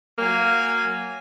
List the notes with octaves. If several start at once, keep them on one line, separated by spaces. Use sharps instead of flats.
F#3 A#3 F5 G#5